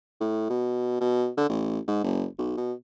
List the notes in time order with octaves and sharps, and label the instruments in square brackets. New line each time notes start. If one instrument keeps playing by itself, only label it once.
[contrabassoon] A2
B2
B2
D3
A1
G#2
F#1
B1
B2